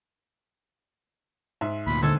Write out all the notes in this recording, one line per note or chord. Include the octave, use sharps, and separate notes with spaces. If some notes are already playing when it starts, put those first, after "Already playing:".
G#2 E5
D2 A#2 B5
G#1 G#2 D3 A4 G#6